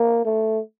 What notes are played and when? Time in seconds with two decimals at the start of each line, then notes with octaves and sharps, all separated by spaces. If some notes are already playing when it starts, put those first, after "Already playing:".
Already playing: A#3
0.25 A3